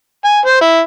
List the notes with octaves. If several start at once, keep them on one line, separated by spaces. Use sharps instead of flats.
G#5
C5
E4